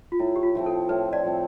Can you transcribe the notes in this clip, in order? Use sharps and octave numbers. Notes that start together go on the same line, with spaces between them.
F4
A2 E4
G4
F4
F3 A3 C4
A4
A2 B4
D5
F3 A3 C4